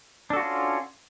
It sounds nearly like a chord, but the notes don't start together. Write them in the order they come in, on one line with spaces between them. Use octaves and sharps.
D4 A4 F#4 F4 C#4